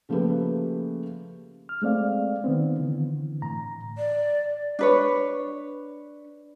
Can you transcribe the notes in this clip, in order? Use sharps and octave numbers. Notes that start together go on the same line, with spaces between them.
C#3 F3 A3 A#3 G4 B4
F6
G#3 A3 C4 D5 F5
D#3 B3 C4
D3 E3
A2 A#5
D5
D4 B4 C#5